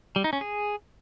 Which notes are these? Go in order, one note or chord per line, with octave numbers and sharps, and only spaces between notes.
G3
D#4
C#4
G#4